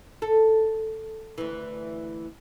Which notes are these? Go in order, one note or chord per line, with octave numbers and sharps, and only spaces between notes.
A4
D2 E3